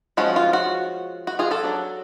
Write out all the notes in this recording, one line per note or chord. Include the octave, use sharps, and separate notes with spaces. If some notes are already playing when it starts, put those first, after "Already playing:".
F3 G#3 C#4 F#4
F4
F#4
F#4
F4 G#4
F#4 A4
F#3 B3 D4